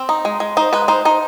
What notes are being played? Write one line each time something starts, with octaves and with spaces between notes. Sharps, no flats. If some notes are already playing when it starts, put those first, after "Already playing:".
Already playing: C4
D#4
G#3
G#3
D#4 C5
G#3 B4
D#4 C5
D#4 C5